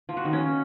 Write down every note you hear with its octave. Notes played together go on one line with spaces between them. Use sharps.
F3
F#4
D#3
C#4